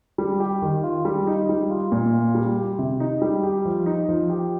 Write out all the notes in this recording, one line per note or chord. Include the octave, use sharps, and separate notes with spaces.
G3
G4
D#3
F4
G3
D#4
G3
F4
A#2
F4
G3
G4
C3
D#4
G3
G4
F3
D#4
F3
G4